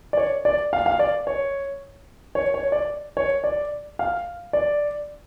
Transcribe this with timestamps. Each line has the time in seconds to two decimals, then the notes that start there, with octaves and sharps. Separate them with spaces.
0.13 D5
0.17 C#5
0.45 D5
0.73 F5
0.86 F5
0.99 D5
1.27 C#5
2.35 C#5
2.54 C#5
2.72 D5
3.17 C#5
3.44 D5
3.99 F5
4.53 D5